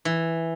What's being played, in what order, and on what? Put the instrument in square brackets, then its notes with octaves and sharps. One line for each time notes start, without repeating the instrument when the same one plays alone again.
[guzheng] E3